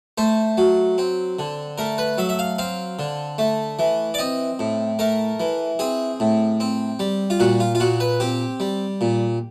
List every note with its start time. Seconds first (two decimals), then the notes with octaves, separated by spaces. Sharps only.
0.18 A3 C5
0.58 F#3
0.98 C4
1.39 D3
1.78 A3 A#4
1.98 B4
2.18 F#3 E5
2.29 E5
2.39 F5
2.58 C4 F5
2.99 D3
3.38 A3
3.79 E3
4.14 D5
4.19 C4 D#5
4.59 A2
4.99 A3 A#4
5.40 E3
5.79 C4 G#4
6.20 A2
6.60 C4
6.99 G3
7.30 F4
7.40 A#2 F#4
7.60 F4
7.75 F4
7.80 A#2 F#4
8.00 B4
8.20 C4 G4
8.60 G3
9.01 A#2